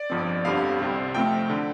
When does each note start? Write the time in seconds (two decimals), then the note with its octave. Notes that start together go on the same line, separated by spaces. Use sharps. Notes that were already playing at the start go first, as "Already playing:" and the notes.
Already playing: D5
0.10 G1 F2 F3 C4
0.45 G1 F2 D3 G3 C4 F5
0.79 C2 C3 G3 C4
1.14 F2 F3 A3 C4 G5
1.50 D3